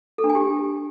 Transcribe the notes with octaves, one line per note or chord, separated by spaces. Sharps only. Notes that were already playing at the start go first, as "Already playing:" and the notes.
A4
D4
G#5
G4